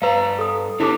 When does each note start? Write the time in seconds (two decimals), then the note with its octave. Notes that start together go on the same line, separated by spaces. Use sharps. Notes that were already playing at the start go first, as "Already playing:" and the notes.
0.02 G2 B4 F5 A#5
0.39 A4 D#6
0.80 D3 D4 E4 G4 A4 D6